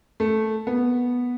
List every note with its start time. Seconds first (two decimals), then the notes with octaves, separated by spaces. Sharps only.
0.20 A3
0.67 B3